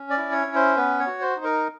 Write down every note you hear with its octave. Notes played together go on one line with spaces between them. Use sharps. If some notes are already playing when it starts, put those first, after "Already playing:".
Already playing: C#4
D5
E4
C#5
C#4
C5
B3 B4
C#5
F#4
C5
D#4
A#4